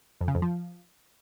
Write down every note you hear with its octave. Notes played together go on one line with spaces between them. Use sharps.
F2
C#3
F2
F3